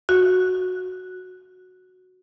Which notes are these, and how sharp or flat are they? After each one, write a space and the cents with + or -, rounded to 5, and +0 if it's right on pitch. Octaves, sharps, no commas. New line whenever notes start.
F#4 -5